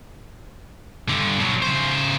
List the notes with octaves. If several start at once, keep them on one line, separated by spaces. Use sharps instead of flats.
G2 D3
B2 F#3
C#3 C5